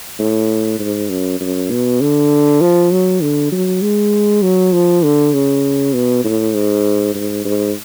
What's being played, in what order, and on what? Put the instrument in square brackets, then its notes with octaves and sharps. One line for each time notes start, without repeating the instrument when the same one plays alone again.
[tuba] A2
G#2
F#2
F#2
B2
D3
F3
F#3
D3
F#3
G#3
F#3
F3
D3
C#3
B2
A2
G#2
G#2
G#2